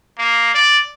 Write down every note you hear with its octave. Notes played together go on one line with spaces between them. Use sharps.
A#3
D5